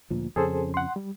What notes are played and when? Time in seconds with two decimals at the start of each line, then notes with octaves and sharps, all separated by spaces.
0.10 D2 A#2 F3
0.36 F2 C#3 C#4 G#4 A4 C5
0.74 F#5 C6
0.96 G3